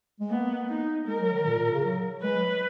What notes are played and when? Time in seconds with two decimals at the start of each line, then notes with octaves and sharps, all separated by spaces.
0.20 G#3
0.30 A#3 B3
0.69 D#4
1.07 G#3 A#4
1.20 F#3
1.33 D#3
1.46 A#2
1.59 A#2
1.72 C#3
1.85 F#3
2.23 G#3 B4
2.36 F#3